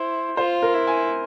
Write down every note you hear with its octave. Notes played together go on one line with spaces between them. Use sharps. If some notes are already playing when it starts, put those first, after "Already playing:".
Already playing: E4 C5
F4 C5
A#4
E4
G#5